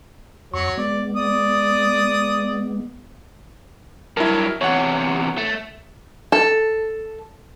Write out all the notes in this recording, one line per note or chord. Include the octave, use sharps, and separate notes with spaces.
F2 F#3 C#5 C#6
G#3 B3 D5
D5 D#6
G2 F#3 E4 A#4
E2 C3 C#5 F#5
A3
A4